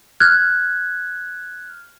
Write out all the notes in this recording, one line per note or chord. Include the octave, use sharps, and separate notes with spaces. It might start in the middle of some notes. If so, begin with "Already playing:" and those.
F6 F#6 G#6